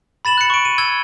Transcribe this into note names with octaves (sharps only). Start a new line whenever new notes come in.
B5 A6 E7 F#7
F#6 C#7
C#6 D7
D#7
E6 G#6 G7